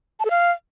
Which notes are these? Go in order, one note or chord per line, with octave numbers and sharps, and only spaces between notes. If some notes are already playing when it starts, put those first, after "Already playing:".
A5
A4
F5